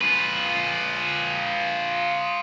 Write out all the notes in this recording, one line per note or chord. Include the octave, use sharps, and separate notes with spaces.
F4 B4